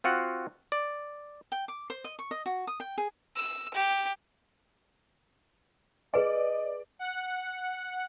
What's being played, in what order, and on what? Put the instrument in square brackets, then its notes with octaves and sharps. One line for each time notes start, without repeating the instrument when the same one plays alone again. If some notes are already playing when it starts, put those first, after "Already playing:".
[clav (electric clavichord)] C4 F4 F#4 F#5
D5
[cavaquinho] G5
D6
C5
D#5
C#6
D#5
F#4
D#6
G5
G#4
[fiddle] E6
G4
[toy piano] G#4 B4 G#5 [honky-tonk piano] D5 [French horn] D#5
[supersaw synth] F#5